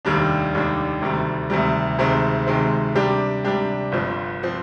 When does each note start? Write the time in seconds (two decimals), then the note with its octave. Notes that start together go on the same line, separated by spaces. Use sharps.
0.05 F1 D#2 D#3 G3 D4
0.53 F1 D#2 D#3 G3 D4
1.02 D2 C3 D#3 G3
1.50 D2 C3 D#3 G3
1.98 D2 C3 D#3 G#3 C4
2.47 D2 C3 D#3 G#3 C4
2.95 C3 G3 D4 G4
3.44 C3 G3 D4 G4
3.92 G1 G2 F3 C4
4.43 F3 C4